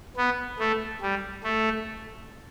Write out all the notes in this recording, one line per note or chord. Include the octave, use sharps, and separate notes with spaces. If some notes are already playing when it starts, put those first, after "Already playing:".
B3
A3
G3
A3